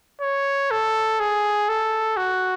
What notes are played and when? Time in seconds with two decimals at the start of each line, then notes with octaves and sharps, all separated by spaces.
0.21 C#5
0.71 A4
1.20 G#4
1.69 A4
2.17 F#4